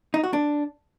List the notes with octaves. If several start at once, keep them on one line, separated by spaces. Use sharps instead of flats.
D#4
F#4
D4